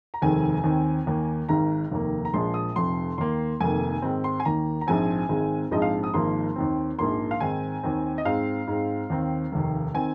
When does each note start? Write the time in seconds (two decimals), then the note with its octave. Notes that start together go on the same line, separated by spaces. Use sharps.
0.14 A#5
0.22 F1 D#2 D#3 G#3 C4 G#5
0.64 D#2 D#3 C4
1.06 D#2 D#3 A#3
1.49 G#1 G#2 D#3 A#5
1.91 F1 D#2 D#3 A#3
2.25 A#5
2.34 A#1 A#2 F3 G#3 C6
2.54 D#6
2.76 F1 F2 F3 C6
3.18 D#2 D#3 A#3 C6
3.60 F1 F2 D#3 A#3 G#5
4.02 G#2 D#3 C4
4.24 C6
4.40 G#5
4.45 D#2 D#3 A#3 A#5
4.81 A#5
4.87 A#1 G#2 F3 G#3 C4 G#5
5.29 G#1 G#2 G#3 C4
5.71 A#1 G#2 F3 G#3 C4 D#5
5.82 F5
6.04 D#6
6.14 G#1 G#2 F3 A#3 C6
6.56 D#2 D#3 C4
6.98 A#1 G#2 F3 A#3 C6
7.31 F5
7.40 G#2 D#3 C4 G#5
7.83 D#2 D#3 C4
8.18 D#5
8.25 G#2 G#3 C4 F5
8.67 G#2 G#3 C4
9.10 D#2 D#3 C4
9.52 F1 D#2 D#3
9.94 D#3 C4 G#5